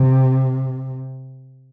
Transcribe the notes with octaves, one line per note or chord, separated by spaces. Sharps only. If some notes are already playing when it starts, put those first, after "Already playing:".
Already playing: C3